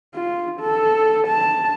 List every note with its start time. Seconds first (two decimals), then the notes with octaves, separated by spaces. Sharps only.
0.15 F4
0.61 A4
1.28 A5